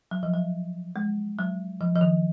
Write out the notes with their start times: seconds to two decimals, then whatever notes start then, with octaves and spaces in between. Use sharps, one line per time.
0.11 F#3
0.23 F3
0.34 F#3
0.96 G#3
1.39 F#3
1.81 F3
1.96 F3
2.01 D#3